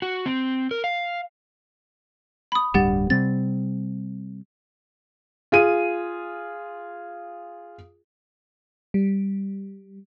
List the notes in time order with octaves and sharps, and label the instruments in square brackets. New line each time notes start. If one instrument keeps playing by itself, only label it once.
[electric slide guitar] F#4
C4
A#4
F5
[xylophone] B5 D#6
[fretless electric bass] D1 G2 G3 [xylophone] G4 F#5 A6
[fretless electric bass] C3 G3 C4 [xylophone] A6
[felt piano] F4 G#4 D#7
[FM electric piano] G3